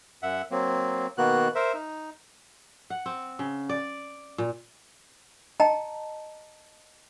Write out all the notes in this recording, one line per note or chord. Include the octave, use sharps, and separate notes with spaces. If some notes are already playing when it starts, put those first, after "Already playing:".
F#2 E5 F#5
F#3 A#3 C4
B2 D#3 A#3 B3 F#4 F#6
A#4 C5 E5
D#4
F#5
C4
C#3
D5
A#2
D#5 G5 A5 A#5